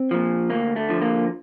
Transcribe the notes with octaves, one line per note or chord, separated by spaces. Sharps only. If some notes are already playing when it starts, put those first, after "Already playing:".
Already playing: C4
A#2 F3
D2 A#3
A3
D3 F3
A#3